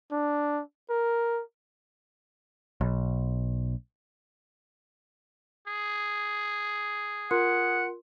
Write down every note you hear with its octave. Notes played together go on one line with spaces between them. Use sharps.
D4
A#4
B1
G#4
F4 A#4 F#5 C6